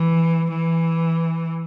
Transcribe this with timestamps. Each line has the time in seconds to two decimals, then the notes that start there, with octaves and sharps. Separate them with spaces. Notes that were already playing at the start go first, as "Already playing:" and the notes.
Already playing: E3
0.50 E3